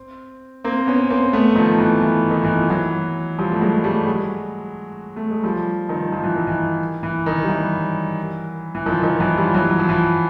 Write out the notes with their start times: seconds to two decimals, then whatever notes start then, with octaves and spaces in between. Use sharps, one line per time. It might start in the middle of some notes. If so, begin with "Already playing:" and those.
Already playing: C4
0.64 A#3 C4
0.87 B3 C#4
1.10 A#3 C4
1.33 A3 B3
1.55 D#3 F3
1.79 E3
2.01 E3
2.30 D#3
2.44 E3
2.57 F3
2.70 E3 F#3
3.39 F3 G3
3.52 A3
3.61 F#3 G#3
3.84 G3 A3
4.07 F#3 G#3
5.16 A3
5.30 G#3
5.44 F3 G3
5.89 D#3 F3
6.12 F3
6.23 E3
6.36 D#3
6.47 E3
7.03 E3
7.26 D#3
7.43 G3
7.49 E3 F#3
8.75 E3
8.86 D#3 F3
9.03 D#3 F3
9.20 E3 F#3
9.38 F3 G3
9.54 E3 F#3
9.70 F#3
9.79 F3
9.89 E3